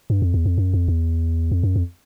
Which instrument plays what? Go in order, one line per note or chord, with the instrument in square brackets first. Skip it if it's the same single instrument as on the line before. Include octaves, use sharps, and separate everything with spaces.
[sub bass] G2
F2
E2
F2
F#2
F2
E2
F2
F#2
F2